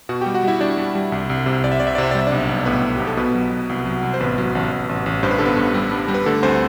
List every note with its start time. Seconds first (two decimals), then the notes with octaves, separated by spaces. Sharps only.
0.09 B2 F#4 F#5
0.21 G3 G4 G5
0.34 F#4 F#5
0.43 G3 E4 E5
0.60 G3 D4 D5
0.78 G3
0.95 G3
1.12 C2
1.30 C2
1.46 C3
1.64 C2 D5
1.72 E5
1.80 C2 D5
1.87 E5
1.95 D5
1.98 C3 E5
2.11 D5
2.15 G3 E5
2.27 D4 D5
2.32 B1
2.49 B1
2.66 A2 B3 B4
2.83 B1
2.96 B1 G4
3.07 A4
3.17 B2 B3 B4
3.35 F#3
3.52 F#3
3.69 C2
3.86 F#3
4.03 C2
4.14 C5
4.20 A1 B3 B4
4.38 F#3
4.55 A1
4.72 A1
4.89 A1
5.06 A1
5.23 G2 C5
5.31 B4
5.39 D3 A4
5.45 B3 B4
5.57 G2
5.74 G3
5.92 G2
6.08 G3
6.14 B4
6.26 D3 A3 A4
6.42 D2 C4 C5